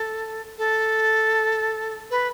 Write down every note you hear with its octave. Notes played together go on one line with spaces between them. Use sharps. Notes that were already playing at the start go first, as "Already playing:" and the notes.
Already playing: A4
A4
B4